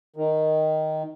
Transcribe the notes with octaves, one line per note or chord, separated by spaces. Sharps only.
D#3